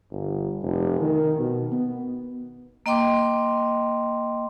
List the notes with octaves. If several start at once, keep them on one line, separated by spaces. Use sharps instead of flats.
G1
F1
D#3
B2
B3
A#3 D#5 G5 C6 D6